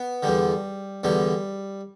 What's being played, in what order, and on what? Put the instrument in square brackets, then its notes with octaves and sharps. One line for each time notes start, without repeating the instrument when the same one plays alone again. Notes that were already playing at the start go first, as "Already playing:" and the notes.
Already playing: [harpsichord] B3
E2 D3 G3
E2 D3 G3